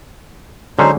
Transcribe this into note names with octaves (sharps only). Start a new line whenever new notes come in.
D3 F#3 G#3 C#4 D#4 C5